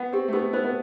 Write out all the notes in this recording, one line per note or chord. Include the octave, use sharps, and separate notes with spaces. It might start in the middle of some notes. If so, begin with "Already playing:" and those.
Already playing: B3 F#5
C4 G4
A3
B3 G4
B3 C5
B3